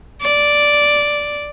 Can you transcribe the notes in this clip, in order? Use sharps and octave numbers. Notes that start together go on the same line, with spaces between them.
D5